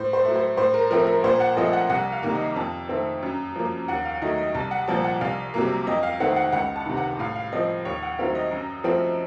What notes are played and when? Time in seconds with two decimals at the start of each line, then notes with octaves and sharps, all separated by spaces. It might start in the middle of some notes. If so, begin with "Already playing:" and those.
Already playing: A2 C5
0.13 C5
0.25 F#3 A3
0.36 C5
0.57 A2 C5
0.74 A#4
0.91 F3 A3 C4 A#4
1.07 A#4
1.24 A#2 C5
1.40 F#5
1.57 F3 A3 C4 D#5
1.73 F#5
1.90 C2 F#5
2.12 F5
2.23 C3 D#3 A#3
2.35 D#5
2.56 F2 A5
2.89 D#3 A3 C4
3.22 F#2
3.56 F3 A#3
3.88 D#2 F#5
4.05 F5
4.21 D#3 F#3 A3 D#5
4.38 D#5
4.55 C2 A5
4.71 F#5
4.88 A#2 F3 C4 A5
5.04 F#5
5.21 C2 F5
5.54 C3 F#3 A#3
5.87 F2 D#5
6.03 F5
6.20 D#3 A3 C4 F#5
6.36 F#5
6.53 C#2 F#5
6.76 A5
6.86 C3 D#3
6.97 F#5
7.19 A2 F5
7.35 F5
7.52 F3 C4 D#5
7.85 D#2 C#5
8.03 F#5
8.19 D#3 F#3 A3 C4 F5
8.35 D#5
8.51 F#2
8.84 F3 A3 C4